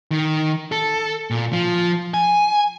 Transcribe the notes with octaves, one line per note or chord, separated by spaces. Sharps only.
D#3
A4
A#2
F3
G#5